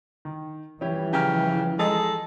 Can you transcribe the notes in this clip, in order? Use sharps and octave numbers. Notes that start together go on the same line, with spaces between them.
D#3
E3 F3 G3 C#4 E4 G4
C#3 G4 A#5 F6
G#3 A4 D#5 A#5